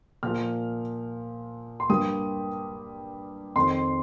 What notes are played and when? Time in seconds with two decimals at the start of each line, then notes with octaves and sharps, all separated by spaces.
0.23 A#2 F3 A#3 F6
1.80 C6
1.89 G2 G3 A#3 D#6
3.56 F2 D#3 C4 C6